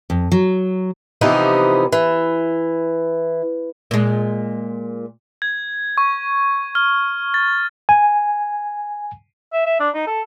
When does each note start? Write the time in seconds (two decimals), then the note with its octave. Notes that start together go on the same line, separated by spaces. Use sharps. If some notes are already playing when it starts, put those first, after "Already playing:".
0.10 F2
0.32 F#3
1.21 C3 E3 F3 B3 D#4 G4
1.92 E3
3.91 A#2 G#3
5.42 G#6
5.98 C#6
6.75 F6
7.34 A6
7.89 G#5
9.53 E5
9.66 E5
9.80 D4
9.94 D#4
10.07 A4